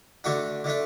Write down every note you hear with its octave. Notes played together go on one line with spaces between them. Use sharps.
D3 A3 D4 F#4
D3 A3 D4